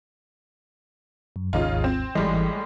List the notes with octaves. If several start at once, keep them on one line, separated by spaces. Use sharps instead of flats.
F#2
G#1 D#2 G#2 C#3 D#4 F4
C4
G#1 A2 E3 G3 G#3